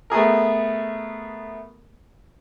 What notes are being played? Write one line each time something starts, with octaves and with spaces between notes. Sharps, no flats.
A3 B3 G#4 A#4